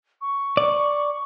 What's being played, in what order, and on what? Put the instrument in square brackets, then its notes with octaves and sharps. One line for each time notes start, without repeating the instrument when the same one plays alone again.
[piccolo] C#6
[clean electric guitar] D5